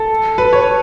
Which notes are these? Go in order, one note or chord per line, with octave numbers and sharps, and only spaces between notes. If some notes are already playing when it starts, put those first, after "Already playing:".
Already playing: A4
B4
C#5